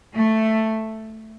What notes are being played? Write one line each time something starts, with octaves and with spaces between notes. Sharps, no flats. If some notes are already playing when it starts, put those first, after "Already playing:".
A3